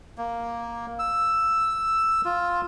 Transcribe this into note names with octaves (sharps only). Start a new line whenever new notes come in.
A#3
E6
F4